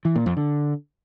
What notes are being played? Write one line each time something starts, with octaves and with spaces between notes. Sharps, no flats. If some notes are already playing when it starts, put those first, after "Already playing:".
E3
A#2
F2
D3